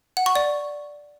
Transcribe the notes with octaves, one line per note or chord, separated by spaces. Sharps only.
F#5
C#6
D5